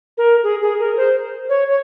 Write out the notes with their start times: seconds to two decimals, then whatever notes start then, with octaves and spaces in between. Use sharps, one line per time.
0.18 A#4
0.43 G#4
0.62 G#4
0.80 A#4
0.97 C5
1.49 C#5
1.68 C#5